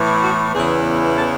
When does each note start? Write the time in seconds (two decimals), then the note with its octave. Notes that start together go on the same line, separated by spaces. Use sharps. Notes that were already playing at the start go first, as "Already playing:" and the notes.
Already playing: A2 E3 B3 E4
0.23 F#4
0.54 E2 C#3 E3 B3 E4 G#4
1.16 A4